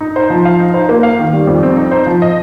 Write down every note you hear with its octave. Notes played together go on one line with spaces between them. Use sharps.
D#4
C5
F3
F5
D#4
C5
A#3
F5
D#3
G3
F2
C4
D#4
C5
F3
D#5